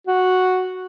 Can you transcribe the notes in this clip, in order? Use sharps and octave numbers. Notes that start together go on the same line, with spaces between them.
F#4